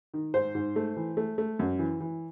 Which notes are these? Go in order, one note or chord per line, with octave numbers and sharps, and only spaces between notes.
D#3
G#2 C5
G#2
A3
E3
A3
A3
F#2
E3
E3